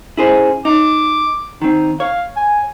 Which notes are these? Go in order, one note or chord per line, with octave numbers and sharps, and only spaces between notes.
C#4 E4 G#4 C5
D#4 D6
D#3 C4 D#4
C#5 F5
G#5